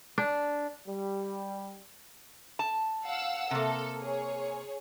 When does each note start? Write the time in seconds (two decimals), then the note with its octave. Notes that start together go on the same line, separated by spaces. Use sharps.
0.18 D4
0.87 G3
2.59 A5
3.04 F5 F#5 E6
3.51 C3 A#3 A4
4.02 G#4 C#5